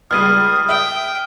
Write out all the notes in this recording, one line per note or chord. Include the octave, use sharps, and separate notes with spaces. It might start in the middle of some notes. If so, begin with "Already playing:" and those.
C#2 G3 G#3 D#6 F6 D#7
E5 G5